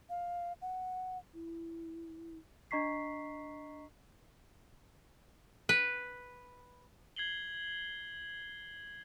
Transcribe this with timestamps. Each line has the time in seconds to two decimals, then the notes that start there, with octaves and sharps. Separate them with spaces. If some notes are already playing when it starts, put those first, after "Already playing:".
0.09 F5
0.61 F#5
1.34 E4
2.71 D4 D#5 A#5 C#6 B6 C7
5.69 B4
7.16 G#6 C7 F#7 G7